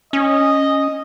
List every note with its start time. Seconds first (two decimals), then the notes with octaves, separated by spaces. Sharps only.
0.13 C#4 D#5